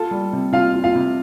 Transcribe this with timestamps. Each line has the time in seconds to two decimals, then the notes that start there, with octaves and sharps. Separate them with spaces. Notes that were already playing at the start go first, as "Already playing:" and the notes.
Already playing: F4 A4 A5
0.11 G3
0.33 C3
0.52 C3 F4 F5
0.73 F4
0.84 F4 F5
0.95 C3